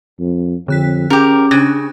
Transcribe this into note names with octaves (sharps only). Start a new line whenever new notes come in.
F2
F2 D3 F#6 B6
C#4 G4 G#4 A#4
C#3 D4 F#6 A#6